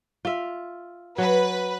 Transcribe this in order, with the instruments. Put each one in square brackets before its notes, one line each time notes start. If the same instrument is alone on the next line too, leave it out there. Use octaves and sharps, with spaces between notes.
[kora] F4 E5
[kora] F#3 [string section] B4